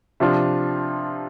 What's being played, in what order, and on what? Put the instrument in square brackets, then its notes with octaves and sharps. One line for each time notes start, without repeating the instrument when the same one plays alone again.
[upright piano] C3 F3 D4 F4